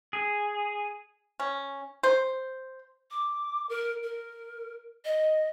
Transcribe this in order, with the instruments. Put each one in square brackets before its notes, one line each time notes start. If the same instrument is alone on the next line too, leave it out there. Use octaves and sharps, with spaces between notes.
[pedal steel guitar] G#4
[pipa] C#4
C5
[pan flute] D6
A#4
A#4
D#5